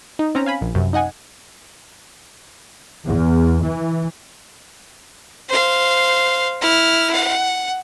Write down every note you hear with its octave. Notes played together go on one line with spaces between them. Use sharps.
D#4
C4 C#4 A#5
F5 G#5 B5
A#1
F#2 C3
D#4 D#5 F#5 G#5
E2
E3
C5 F5
E4 F6
F#5